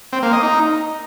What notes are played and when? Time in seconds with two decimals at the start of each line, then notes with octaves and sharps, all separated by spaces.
0.13 C4
0.23 A#3
0.33 D#5
0.43 D#4